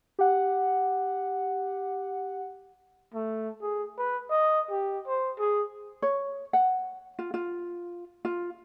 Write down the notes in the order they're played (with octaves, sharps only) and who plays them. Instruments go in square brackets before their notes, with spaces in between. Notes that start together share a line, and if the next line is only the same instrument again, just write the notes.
[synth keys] G4 F#5
[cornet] A3
G#4
B4
D#5
G4
C5
G#4
[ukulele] C#5
F#5
F4
F4
F4